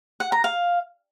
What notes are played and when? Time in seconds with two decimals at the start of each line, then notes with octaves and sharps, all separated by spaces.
0.20 F#5
0.32 A#5
0.44 F5